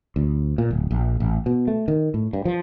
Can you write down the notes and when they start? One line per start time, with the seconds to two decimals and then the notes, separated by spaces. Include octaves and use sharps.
0.16 D2
0.58 A#2
0.71 D1
0.91 A#1
1.20 A1
1.46 B2
1.68 A3
1.88 D#3
2.14 A2
2.33 G2
2.45 F3